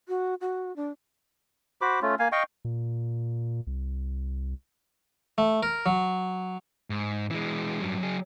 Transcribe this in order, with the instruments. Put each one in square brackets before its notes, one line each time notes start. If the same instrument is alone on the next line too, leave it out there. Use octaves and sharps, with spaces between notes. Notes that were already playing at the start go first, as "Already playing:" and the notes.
[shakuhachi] F#4
F#4
D4
[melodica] F#4 C5 B5 D6
A3 C#4 F4
A#3 F5 G#5
D#5 F5 G5 C#6
[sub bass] A#2
C2
[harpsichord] A3
A#4
F#3
[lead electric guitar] G#2
E3 G#3
G2 F#3
F#3 G#4